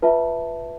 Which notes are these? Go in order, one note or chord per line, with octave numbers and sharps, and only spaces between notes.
F4 B4 E5 A5